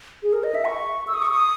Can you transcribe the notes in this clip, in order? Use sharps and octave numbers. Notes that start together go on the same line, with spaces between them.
G#4
A#4
D#5
E5
C#6
E6
D#6
C#6
D#6